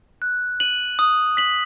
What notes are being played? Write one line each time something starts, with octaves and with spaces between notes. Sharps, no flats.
F#6
D#7 F#7
D#6
B6 F#7